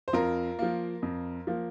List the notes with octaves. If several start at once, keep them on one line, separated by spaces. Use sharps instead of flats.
C5
F2 F4 A#4
F3 A#3
F2
F3 A#3